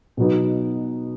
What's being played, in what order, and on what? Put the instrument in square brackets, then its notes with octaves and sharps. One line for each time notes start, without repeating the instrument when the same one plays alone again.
[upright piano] B2 F#3 B3 D#4